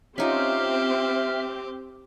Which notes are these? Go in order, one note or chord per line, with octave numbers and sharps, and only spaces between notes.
C4 C#4 D#4 F4 G4 E5 F6